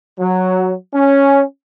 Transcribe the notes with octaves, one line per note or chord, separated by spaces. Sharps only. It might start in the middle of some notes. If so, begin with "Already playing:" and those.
F#3
C#4